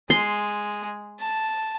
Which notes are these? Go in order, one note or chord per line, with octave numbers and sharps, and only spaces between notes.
G#3 C6
A5